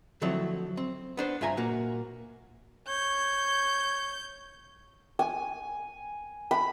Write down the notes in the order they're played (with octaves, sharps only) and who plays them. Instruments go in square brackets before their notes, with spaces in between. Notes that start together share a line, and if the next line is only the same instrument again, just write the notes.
[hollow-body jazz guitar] D3 F3 F#3 A3 C4 E4
C4
B3 D4 C5
G2 F4 E5 G#5 A#5
A#2 A#3 F#4
[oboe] C#5 [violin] G6
[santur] G#5
B5